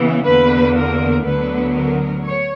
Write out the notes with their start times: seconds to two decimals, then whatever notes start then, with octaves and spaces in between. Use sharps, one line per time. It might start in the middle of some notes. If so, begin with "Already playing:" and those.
Already playing: C#3 E3 B3
0.27 E2 D3 A#3 B4
0.77 A#4
1.26 D2 D3 F#3 B3 B4
1.76 A#4
2.25 C#5